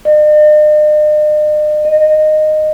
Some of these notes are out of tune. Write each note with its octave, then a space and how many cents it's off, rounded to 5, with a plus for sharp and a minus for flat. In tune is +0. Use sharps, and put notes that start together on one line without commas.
D#5 -45
D#5 -15